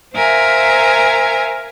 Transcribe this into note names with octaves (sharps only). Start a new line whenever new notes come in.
A#4 C5 E5 F5 G#5 A#5